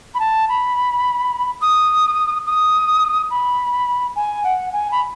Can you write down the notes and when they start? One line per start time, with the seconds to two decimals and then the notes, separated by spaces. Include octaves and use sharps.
0.14 B5
0.19 A5
0.48 B5
1.61 D#6
2.45 D#6
3.30 B5
4.15 G#5
4.44 F#5
4.72 G#5
4.91 B5